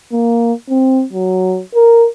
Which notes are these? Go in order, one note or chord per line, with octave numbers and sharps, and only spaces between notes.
A#3
C4
F#3
A#4